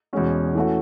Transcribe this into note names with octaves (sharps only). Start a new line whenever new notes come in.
E2 B2 G#3 C#4 F#4
E3 A3 C#4 F#4